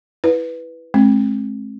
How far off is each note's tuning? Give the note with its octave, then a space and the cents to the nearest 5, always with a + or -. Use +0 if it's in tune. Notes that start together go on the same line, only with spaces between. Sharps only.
E4 +0 B4 +0
G#3 +45 C4 +35